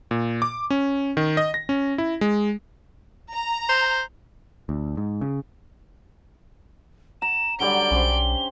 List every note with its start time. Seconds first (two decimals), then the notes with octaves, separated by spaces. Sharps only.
0.11 A#2
0.42 D6
0.70 C#4
1.17 D#3
1.37 D#5
1.54 A#6
1.69 C#4
1.98 E4
2.21 G#3
3.33 A#5
3.69 C5
4.69 D2
4.97 G#2
5.21 C#3
7.22 A#5 E7
7.60 D3 F#3 G3 D5 D7 G7
7.91 B1 C#4 G4 C5